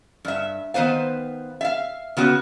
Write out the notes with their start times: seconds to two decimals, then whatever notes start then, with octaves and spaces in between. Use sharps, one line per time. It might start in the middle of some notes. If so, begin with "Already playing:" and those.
0.25 G2 E5
0.74 D#3 B3 B4 C5 F5
1.61 E5 F5
2.17 C#3 B3 F#4